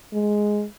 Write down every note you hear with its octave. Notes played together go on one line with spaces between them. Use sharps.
G#3